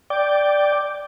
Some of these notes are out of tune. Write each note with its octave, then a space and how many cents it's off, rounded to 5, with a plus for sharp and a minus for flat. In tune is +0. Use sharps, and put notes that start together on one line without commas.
D5 +0 G5 +0